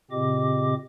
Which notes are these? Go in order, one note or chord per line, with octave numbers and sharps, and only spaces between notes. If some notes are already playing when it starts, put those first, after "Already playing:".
A#2 C#3 C4 G4 D#5 D6